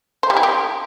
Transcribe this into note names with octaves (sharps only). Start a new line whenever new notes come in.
C5
G3
E4
G4